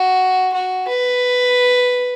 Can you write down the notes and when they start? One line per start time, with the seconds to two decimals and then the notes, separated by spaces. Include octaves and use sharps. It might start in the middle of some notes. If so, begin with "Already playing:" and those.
Already playing: F#4
0.53 F#4
0.88 B4